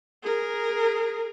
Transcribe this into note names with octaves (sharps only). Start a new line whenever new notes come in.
G#4 A#4